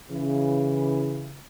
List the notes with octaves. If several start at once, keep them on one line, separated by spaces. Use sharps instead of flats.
C#3 E3